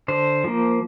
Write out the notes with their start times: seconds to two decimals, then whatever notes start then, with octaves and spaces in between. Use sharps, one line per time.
0.08 D3 C5
0.44 F3 A#3